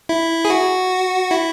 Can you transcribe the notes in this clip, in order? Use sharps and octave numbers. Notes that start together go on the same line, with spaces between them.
E4
G#4
F#4
E4